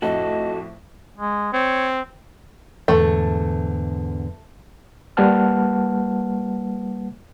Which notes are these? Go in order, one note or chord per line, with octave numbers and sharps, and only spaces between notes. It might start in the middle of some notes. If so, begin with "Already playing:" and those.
F2 A2 F#4 A4 D#5
G#3
C4 C#5
E2 G#2 D3 A3
G3 A#3 B4 F#5 A5 F6